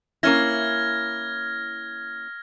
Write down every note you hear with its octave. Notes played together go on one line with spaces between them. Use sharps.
A#3 C#4 E4 F6 G#6 A#6